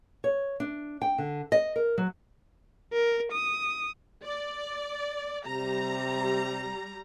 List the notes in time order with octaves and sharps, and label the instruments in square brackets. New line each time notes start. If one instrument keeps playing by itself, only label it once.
[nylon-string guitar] C#5
D4
G5
D3
D#5
A#4
F#3
[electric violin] A#4
D#6
[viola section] D5
[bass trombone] C3 [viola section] G3 A#5